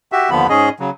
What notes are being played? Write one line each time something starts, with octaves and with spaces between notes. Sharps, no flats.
F#4 G4 E5
D#2 D3 F3 B3 B5
G#2 C#4 G#4 D#5
C#3 F#3